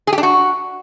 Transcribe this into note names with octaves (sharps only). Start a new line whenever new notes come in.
G#4
G4
D4
F#4